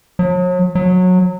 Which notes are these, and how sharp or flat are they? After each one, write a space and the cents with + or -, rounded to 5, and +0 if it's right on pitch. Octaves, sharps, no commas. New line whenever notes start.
F#3 -40
F#3 -20